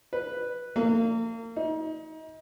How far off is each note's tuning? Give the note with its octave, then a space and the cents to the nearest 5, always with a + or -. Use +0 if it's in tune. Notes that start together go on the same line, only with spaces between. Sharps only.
B4 -5
A#3 -35
D#4 +30